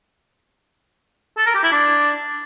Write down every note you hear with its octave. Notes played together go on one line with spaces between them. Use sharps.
A4
A#4
G4
E4
D4